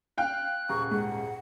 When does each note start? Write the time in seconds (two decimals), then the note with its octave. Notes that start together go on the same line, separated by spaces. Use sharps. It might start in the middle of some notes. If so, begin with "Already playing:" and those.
0.18 F5 G5 F#6
0.69 D#1 C#3 A#5 C#6
0.91 G#2 F#5